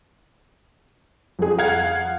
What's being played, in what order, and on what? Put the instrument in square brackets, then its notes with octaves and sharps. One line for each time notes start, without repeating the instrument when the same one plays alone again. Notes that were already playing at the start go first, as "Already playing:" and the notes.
[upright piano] F2 G#4
[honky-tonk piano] F5 F#5 G#6